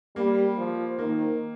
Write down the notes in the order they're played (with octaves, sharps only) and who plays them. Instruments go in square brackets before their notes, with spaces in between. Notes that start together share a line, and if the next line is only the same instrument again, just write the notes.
[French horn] G3 [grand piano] A#3
[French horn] F3
[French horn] D#3 [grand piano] A#3